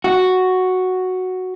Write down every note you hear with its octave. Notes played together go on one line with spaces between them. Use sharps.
F#4